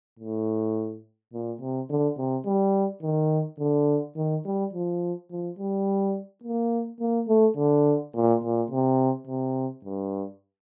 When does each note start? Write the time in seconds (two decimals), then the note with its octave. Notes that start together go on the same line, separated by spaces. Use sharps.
0.19 A2
1.33 A#2
1.61 C3
1.89 D3
2.17 C3
2.45 G3
3.02 D#3
3.59 D3
4.16 D#3
4.45 G3
4.73 F3
5.30 F3
5.59 G3
6.43 A#3
7.00 A#3
7.28 A3
7.57 D3
8.15 A#2
8.43 A#2
8.70 C3
9.27 C3
9.84 G2